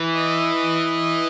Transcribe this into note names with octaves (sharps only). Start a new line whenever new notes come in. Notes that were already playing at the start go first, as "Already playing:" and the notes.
Already playing: E3
D#5